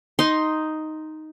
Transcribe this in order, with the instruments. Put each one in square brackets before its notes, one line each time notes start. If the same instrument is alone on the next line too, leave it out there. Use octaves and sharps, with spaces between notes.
[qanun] D#4 C6